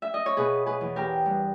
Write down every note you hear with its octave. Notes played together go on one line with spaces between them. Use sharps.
E5
D#5
C#5
B2 G#4 B4
G#4 B4
E2
G4 A#4
G2